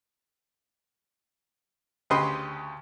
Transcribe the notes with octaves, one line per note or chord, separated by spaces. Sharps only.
D2 C#3 G4 B4 D#5 C6